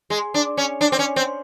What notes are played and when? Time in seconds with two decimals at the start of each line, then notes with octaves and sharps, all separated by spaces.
0.10 G#3
0.34 D4
0.57 C#4
0.81 D4
0.92 C4
0.99 C#4
1.16 C4